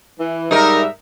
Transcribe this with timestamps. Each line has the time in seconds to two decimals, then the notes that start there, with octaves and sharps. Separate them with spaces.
0.19 E3
0.51 G#2 G3 D#4 A#4 E5